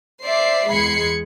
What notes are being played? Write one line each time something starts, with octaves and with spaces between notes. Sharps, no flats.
C5 D5 E5 C7
E2 G#3 B5 G#6 C7 C#7